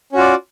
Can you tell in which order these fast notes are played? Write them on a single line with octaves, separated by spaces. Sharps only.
C#4 F#4 F4 D5